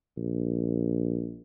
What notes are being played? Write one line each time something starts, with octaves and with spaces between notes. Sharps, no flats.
A#1